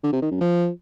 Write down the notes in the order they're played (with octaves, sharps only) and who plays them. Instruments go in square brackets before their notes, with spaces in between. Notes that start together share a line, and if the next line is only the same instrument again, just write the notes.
[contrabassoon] D3
C3
D#3
F#2
F3